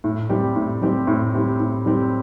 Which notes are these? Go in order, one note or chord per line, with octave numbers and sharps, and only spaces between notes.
A2
G3 C4 G4
A2
G3 C4 G4
A2
G3 C4 G4
A2
G3 C4 G4